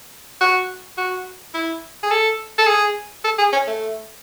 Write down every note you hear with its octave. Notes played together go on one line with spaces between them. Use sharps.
F#4
F#4
E4
G#4
A4
A4
G#4
A4
G#4
C#4
A3